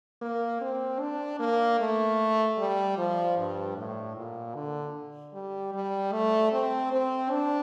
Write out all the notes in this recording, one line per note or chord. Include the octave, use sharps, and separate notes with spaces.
A#3
C4
D4
A#3
A3
G3
F3
G2
A2
A#2
D3
G3
G3
A3
C4
C4
D4